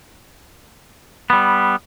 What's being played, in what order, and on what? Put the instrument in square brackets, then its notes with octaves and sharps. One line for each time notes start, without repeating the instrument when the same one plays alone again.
[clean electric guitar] G3 B3